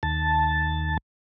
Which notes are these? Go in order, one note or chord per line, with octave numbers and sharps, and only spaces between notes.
D#2 A5